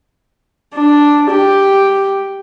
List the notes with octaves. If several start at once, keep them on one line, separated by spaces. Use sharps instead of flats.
D4
G4